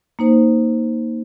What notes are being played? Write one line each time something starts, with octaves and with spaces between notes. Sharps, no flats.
A#3 D#4 C5